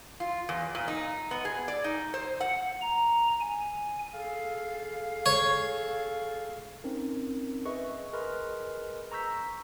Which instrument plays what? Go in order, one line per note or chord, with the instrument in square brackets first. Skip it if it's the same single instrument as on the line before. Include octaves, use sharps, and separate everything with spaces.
[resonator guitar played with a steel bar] F4
E2
A#2
D#4
B3
G#4
D5
D#4
C5
F#5
[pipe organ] A#5
G#5
[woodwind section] G#4 A4 F5
[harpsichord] C#5
[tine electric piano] C4 C#4 D#4 A#4
G#4 B4 D#5 E5 C#6
G#4 A#4 B4 D#5 C6 F6
A#5 C#6 E6 G6 B6